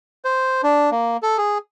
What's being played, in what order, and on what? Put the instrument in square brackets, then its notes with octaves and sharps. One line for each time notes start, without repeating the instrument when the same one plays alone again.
[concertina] C5
D4
A#3
A4
G#4